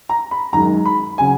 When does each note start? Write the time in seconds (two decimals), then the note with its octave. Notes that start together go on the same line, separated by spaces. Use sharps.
0.09 A#5
0.31 B5
0.53 F#2 D#3 G#3 D#4 A#5
0.86 B5
1.18 C#3 F#3 G#5